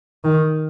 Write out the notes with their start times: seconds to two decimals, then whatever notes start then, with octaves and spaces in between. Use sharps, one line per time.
0.24 D#3